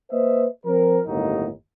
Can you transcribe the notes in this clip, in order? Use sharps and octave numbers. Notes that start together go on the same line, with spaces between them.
A#3 B4 C5 D#5 E5
F3 C4 A#4
G1 D#2 A2 F#3 D#4